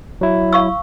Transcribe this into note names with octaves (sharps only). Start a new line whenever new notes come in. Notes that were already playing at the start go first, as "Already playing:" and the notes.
F#3 E4
F5 C#6 E6